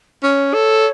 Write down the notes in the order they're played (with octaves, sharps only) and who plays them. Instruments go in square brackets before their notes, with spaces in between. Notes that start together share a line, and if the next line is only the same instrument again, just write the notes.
[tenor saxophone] C#4 [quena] C#5
[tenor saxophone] A4